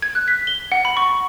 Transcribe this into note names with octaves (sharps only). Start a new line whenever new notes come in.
G#6
F#6
B6
G7
F#5
B5
C#6